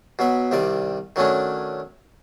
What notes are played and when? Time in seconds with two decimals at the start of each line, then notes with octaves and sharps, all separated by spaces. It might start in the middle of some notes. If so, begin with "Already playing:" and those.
0.19 B2 F#3 E5
0.51 C2 C3 D#3 D5
1.16 D#3 F#3 A3 C#4 D4